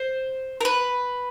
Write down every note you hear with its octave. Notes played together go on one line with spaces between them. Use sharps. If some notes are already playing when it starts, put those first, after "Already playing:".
Already playing: C5
A#4
B4